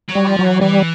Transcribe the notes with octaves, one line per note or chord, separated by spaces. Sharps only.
F#3
G3
F3
F#3
E3
E3 G3